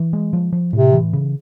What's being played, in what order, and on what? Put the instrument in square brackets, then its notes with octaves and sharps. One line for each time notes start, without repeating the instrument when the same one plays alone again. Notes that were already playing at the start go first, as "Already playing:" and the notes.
Already playing: [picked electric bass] E3
G#3
F3
F3
[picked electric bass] A2 [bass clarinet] C3
[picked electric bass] E3
C#3